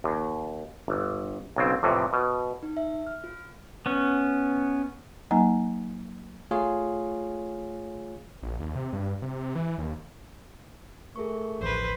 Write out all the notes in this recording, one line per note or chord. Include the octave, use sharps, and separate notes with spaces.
D#2
G1
B1 C#3 C4
F2 A2 C3 E3
B2
D#4
E5
F6
F4
B3 C#4
F#3 A#3 D#4 G#5 A#5
A3 F4 G#4 C#5 F5
A#1
D#2
C3
G2
C3
C3
E3
D#2
A3 G#4 A#4 C#6
A1 D2 F3 B4 C5